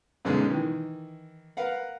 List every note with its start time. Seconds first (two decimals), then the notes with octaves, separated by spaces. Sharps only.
0.25 F#2 B2 D3 G#3 C#4 D#4
0.51 D#3 E3
1.57 A#4 B4 F5 F#5